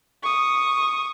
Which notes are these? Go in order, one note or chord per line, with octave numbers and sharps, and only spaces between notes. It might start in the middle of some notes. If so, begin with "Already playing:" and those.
C#6 D#6